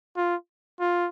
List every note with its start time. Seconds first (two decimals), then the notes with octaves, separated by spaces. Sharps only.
0.16 F4
0.80 F4